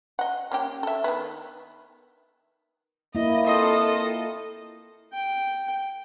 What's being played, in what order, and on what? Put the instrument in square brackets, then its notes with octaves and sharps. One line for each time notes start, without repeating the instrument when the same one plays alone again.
[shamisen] D#5 F#5
A#3 C#4 G4
A4 E5
D#3 B3
[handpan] A#3 E4 [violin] D#5
[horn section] C4 F4 D#5 [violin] A4
[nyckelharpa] G5